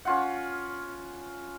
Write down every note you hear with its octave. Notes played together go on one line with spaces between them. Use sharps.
C#4 F4 F#5